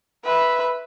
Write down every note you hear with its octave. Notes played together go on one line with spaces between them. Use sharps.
B4 E5